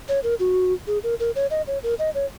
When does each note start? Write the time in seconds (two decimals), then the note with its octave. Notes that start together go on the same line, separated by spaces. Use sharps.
0.09 C#5
0.24 A#4
0.40 F#4
0.87 G#4
1.04 A#4
1.20 A#4
1.36 C#5
1.51 D#5
1.67 C#5
1.83 A#4
1.99 D#5
2.15 C#5